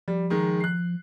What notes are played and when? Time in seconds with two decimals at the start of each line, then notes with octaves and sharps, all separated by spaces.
0.08 F3 G3
0.30 D#3 G#3
0.61 F#6 C7